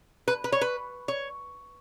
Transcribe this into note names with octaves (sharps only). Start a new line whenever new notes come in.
B4
B4
C#5
B4
C#5